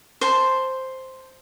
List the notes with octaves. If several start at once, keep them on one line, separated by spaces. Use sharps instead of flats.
C5 A5